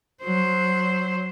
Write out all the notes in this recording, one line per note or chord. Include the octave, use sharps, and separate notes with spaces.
F#3 C5